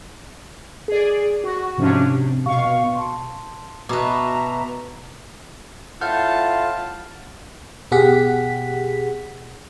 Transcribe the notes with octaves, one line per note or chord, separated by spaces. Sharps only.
G#4 D5
F#4
G#2 C3 F3 C#4 D4
C3
B2 F5 C#6
A5 C6
B2 F#4 B4 E5 A5 A#5 D6
A2 F4 F#5 A5 F6 G6
B2 G4 G#4 F#5 B6